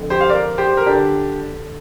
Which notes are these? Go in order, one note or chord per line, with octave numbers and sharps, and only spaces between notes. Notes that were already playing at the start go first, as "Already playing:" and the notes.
Already playing: F2 D3
G4 C5
F5
A#4 D5
G4 C5
A#4
D3 D4 G4